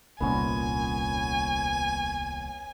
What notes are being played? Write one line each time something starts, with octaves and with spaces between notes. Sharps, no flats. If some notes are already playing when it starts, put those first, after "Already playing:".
D#1 C2 A#2 B3 C#4 F#4 G#5